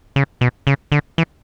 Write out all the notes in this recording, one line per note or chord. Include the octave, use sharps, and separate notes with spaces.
C#3
B2
C#3
D3
E3